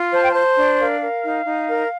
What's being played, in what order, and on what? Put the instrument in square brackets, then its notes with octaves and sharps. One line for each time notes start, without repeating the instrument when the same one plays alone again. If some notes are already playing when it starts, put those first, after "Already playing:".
Already playing: [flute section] F4
C5 A5
G5
C5 A5
D4
A#4 F5
A#4
D#4
D#4
A#4